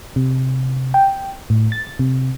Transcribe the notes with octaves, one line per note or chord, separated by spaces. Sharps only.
C3
G5
A2
A6
C3